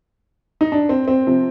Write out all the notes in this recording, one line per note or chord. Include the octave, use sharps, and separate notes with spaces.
D#4
D4
C4
C4
C3 F3